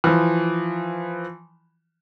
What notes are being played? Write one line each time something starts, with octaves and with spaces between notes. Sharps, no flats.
E3 F3